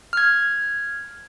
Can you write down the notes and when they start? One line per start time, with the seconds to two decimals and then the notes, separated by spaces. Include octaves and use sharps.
0.13 F6 G#6